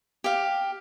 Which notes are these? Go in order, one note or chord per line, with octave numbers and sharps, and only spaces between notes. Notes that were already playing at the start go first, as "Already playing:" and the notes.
G4 F5